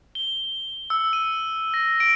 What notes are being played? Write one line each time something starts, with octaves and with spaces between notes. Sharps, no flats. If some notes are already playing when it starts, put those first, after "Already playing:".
G7
E6
D#7
A#6
D7